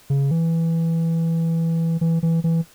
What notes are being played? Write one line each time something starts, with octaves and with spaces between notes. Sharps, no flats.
C#3
E3
E3
E3
E3